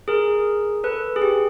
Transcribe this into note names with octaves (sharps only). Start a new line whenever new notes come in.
G#4 A#4
A4 B4
G#4
G4